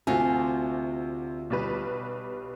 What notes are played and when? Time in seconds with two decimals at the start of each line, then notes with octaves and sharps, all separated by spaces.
0.07 D2 C3 F4 F#4 G#5
1.50 B1 G3 B4